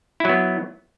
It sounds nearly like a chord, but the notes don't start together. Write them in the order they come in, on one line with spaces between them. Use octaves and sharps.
E4 F#3 B3